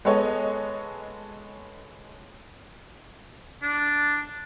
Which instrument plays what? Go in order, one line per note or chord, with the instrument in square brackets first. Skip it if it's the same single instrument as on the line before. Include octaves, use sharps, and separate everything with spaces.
[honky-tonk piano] G#3 B3 A4 C#5 D#5
[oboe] D4